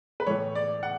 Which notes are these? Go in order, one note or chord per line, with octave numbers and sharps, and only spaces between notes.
B4
A2 E3 C#5
D5
F#5